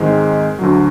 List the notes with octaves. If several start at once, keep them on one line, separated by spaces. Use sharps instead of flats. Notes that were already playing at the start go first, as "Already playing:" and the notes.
Already playing: G#2 D#3 G#3 C4
D2 D3 F#3